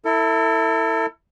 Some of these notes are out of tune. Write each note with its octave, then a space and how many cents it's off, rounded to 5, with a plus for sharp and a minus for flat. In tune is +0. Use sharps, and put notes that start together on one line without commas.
E4 -5 A4 +35